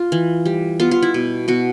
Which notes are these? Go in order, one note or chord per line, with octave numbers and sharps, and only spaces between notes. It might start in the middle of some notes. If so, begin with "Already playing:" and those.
Already playing: F4
E3
G3
B3 F4
F4
E4
B2
B2 F#4